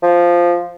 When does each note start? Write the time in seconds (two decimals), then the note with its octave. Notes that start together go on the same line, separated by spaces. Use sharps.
0.03 F3